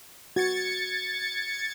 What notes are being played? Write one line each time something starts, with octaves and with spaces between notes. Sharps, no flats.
F#4 G#6 A6 C#7